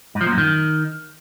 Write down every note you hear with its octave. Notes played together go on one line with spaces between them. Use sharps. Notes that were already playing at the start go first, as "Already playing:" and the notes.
G#2
F3
A#2
F#2
D#3